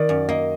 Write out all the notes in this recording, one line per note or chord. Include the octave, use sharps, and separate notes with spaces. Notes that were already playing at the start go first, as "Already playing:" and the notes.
Already playing: D#3 A#3 D5
F#2
A#3 D#5